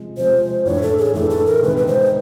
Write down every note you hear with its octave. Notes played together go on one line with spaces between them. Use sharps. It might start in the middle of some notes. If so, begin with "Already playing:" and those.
Already playing: C3 F3 G#3
C3 F3 G#3 C5
A2 E3 A3 D4 C#5
A4
G#4
A2 E3 A3 D4 A4
A4
A#4
C3 D#3 G#3 B3 B4
B4
C5